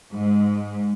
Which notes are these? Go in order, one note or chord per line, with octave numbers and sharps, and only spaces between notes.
G#2